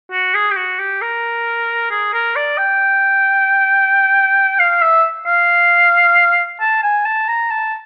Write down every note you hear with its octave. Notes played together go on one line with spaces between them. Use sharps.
F#4
G#4
G4
F#4
G4
A#4
G#4
A#4
D5
G5
F5
E5
F5
A5
G#5
A5
A#5
A5